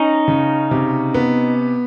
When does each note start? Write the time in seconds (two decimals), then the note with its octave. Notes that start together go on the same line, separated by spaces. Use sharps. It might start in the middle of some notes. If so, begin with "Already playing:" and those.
Already playing: C#4 D#4
0.28 C#3
0.71 C3
1.14 B3